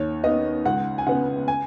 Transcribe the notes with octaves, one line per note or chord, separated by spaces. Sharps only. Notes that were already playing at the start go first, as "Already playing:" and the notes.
Already playing: D#2 C#5
D#3 B3 D#5
C#2 F#5
G#5
C#3 B3 F#5
G#5